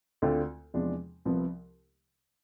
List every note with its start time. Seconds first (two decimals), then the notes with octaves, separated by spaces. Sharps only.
0.22 D2 D3 A3 C4 F4
0.74 E2 C3 F3 G#3 D4
1.25 C2 C3 F3 B3